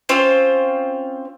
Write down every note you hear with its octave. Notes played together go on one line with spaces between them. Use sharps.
C4 C#4 F4 C5